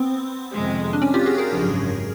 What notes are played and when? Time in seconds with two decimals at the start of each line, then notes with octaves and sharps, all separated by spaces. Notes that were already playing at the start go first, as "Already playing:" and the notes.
Already playing: B3 C4
0.52 F2 C3 D#3 G#3
0.93 D4
1.02 C#4
1.14 F4 G4
1.26 F#4 G#4
1.38 G#4 A#4
1.50 G#1 F#2 C#3 F3